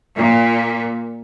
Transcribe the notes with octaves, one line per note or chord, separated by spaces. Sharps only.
A#2